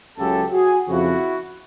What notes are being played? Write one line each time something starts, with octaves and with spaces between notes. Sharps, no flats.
C#2 C#3 F#3 G4 A4
F#4 G#4
F2 C#3 F3 E4 F#4